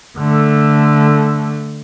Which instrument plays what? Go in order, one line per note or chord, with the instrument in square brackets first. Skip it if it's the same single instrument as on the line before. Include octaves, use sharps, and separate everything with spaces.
[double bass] D3 A3